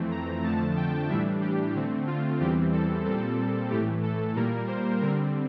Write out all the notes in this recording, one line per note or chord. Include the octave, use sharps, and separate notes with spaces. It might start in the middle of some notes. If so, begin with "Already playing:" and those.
Already playing: F2 E3 A3 C4
A#5
F2 D3 F3 A3 A5
G5
A2 E3 G3 D4 E5
G4
D3 A3 C4
F4
E2 E3 G3 C4 G4
A4
A#2 G3 C4 A4
A2 E3 A3 G4
A4
A#2 G3 A#3 A#4
C5
D3 G3 C4 A#4